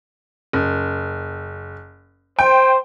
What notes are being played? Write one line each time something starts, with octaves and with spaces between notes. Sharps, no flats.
F#1
C5 G5